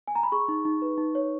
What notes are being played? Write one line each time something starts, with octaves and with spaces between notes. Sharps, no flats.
G#5
A#5
B5
G#4 C#6
D#4
D#4
B4
D#4
C#5